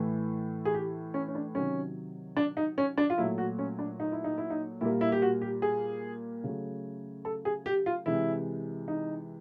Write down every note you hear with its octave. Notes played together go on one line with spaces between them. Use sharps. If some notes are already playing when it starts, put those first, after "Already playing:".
Already playing: A2 E3 A3
G#4
G4
C#4
C#4
D4
C3 D#3 F#3 C#4
D4
D#4
C#4
D4
F4
A#2 F#3 A3 E4
F#4
C#4
D4
D#4
E4
D#4
E4
D#4
A#2 G3 A#3 E4
E4
G4
F#4
G4
G#4
C#3 F#3 A3
A4
G#4
G4
F4
C3 E3 G#3 E4
D#4